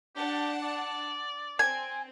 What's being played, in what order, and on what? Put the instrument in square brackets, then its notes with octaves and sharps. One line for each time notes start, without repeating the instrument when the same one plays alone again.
[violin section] D4 F#5 A5 [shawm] G4
[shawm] D5
[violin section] C4 [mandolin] G#5